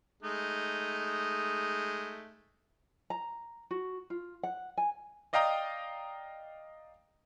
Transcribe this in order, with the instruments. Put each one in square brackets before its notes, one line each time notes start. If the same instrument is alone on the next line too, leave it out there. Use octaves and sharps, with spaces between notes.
[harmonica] G#3 A3 D#4
[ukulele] A#5
F#4
F4
F#5
G#5
[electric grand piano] D5 D#5 F5 G5 A#5 D#6